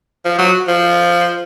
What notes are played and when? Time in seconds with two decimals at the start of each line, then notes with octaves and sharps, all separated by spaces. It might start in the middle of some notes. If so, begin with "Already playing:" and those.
0.25 F3
0.38 F#3
0.68 F3